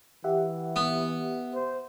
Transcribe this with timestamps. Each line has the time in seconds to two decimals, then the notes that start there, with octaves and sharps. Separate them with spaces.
0.24 E3 G4 E5 F#5
0.76 B3
1.53 C5